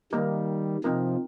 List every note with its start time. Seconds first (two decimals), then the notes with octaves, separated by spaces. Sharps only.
0.12 D#3 G3 A#3 D#4 A#4
0.84 C3 F3 C4 D#4 A#4